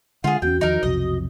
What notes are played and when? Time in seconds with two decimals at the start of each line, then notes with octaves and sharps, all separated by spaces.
0.24 D3 G#3 F4 G#4 F#5
0.42 E2 A#3 C#4 F#4 G5
0.61 E2 D#3 F3 D#4 A#4
0.83 B1 F2 C3 D#5